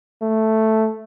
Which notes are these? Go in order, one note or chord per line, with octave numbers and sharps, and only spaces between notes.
A3